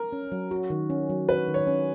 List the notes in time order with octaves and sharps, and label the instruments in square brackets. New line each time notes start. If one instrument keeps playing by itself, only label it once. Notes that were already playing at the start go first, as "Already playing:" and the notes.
Already playing: [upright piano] A#4
[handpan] C#4
F#3
F#4
D#3
C#4
F#3
[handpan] F#4 [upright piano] B4
[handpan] D#3
[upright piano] C#5
[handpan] C#4